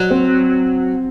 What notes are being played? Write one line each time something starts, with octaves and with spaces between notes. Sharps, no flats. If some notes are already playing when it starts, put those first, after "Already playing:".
Already playing: F#3
C4